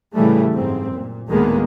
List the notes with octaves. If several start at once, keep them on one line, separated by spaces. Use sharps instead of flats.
A2 C#3 E3 G3 A3
F#1 G#2 C4
A#2
D2 A2 D#3 G#3 A#3 B3